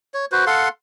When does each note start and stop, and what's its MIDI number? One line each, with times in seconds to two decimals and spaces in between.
0.14 0.25 73
0.32 0.45 66
0.32 0.45 71
0.32 0.45 72
0.47 0.69 69
0.47 0.69 77
0.47 0.69 78
0.47 0.69 84